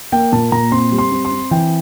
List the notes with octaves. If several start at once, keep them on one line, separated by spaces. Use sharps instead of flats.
A#3 G5
A#2 A5
A#2 A#5
C4 C6
G3
C6
C4
C6
C4
E3 G5